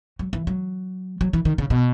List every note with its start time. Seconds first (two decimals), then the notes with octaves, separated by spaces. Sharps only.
0.19 F#3
0.33 E3
0.47 F#3
1.21 F#3
1.33 E3
1.45 D#3
1.58 C#3
1.70 B2